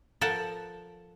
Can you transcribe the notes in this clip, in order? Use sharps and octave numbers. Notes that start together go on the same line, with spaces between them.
F3 A4 A#4 F#5 A5